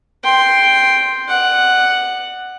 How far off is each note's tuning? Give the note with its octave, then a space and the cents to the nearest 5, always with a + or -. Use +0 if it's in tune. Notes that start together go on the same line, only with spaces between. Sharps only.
G5 +0 C6 +0
D5 +35 F#5 +0